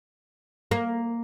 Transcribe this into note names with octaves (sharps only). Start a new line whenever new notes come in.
A#3